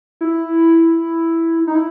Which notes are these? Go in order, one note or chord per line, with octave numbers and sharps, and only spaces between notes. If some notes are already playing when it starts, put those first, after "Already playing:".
E4
D#4
E4